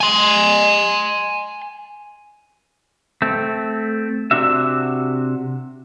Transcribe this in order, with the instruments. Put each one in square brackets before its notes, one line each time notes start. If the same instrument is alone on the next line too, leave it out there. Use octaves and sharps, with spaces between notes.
[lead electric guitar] G#5 C6
[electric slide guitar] A3 C4
C3 D4 F#4 E5